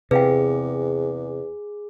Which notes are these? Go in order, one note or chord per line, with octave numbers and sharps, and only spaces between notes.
E2 C3 G#4 B4 F5 G5